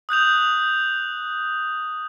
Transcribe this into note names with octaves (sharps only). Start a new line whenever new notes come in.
D#6 F#6 G6 F7